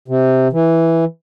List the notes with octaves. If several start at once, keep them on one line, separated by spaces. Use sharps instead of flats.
C3
E3